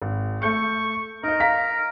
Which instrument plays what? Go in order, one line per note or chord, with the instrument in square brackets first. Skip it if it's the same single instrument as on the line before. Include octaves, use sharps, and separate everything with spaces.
[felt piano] G#1
[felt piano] A3 G6 C#7 [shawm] C#6
[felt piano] D#4 D#5 [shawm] A#4
[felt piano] F5 A#5 B6